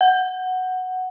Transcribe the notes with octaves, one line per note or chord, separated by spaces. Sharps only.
F#5